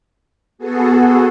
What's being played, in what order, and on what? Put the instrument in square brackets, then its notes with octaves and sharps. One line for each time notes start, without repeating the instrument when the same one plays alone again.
[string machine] B3 F#4 G#4 A4